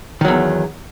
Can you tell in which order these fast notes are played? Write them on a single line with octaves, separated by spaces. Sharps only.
D#3 F#3 E2